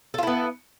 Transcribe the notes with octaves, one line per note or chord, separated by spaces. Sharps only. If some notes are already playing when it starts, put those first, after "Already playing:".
B3 E4 F4 A4